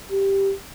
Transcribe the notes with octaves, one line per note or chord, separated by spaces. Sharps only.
G4